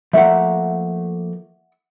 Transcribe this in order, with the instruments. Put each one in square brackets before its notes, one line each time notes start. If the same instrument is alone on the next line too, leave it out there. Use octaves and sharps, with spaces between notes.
[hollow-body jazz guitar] F3 A3 A#3 [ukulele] E5 F#5